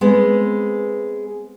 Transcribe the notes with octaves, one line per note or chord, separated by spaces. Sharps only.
G#3 B3 C4